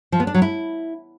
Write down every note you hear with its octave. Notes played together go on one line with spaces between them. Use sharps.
F3
B3
D4
F#3
E4